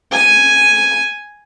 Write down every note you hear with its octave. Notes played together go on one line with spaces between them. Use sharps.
G#5